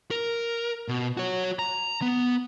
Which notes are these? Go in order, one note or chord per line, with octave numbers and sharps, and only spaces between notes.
A#4
B2
F#4 C#5
A#5
B3